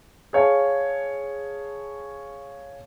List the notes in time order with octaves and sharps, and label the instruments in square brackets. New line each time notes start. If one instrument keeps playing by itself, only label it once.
[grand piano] G#4 C#5 F5 A5